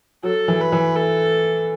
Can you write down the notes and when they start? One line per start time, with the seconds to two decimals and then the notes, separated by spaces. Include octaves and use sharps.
0.23 F#3 A4
0.48 E3
0.60 B4
0.72 E3
0.96 A4